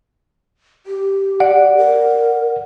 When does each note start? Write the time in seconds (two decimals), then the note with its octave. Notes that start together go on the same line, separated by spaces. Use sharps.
0.86 G4
1.40 D5 F#5
1.77 A#4